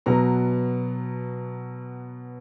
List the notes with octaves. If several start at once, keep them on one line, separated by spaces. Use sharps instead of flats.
B2 F#3 B3 A#5